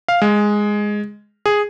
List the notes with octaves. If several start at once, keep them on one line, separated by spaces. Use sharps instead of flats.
F5
G#3
G#4